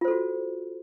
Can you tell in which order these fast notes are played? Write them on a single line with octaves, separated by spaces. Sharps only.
F4 C5 A4 F#4